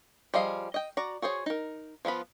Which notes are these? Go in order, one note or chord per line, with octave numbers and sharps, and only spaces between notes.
F3 G3 G#4 D#5 F5
D#5 G5
F#4 D5 A#5
F#4 G#4 C5 C#5
D#4 A#4
F3 B3 F4 B5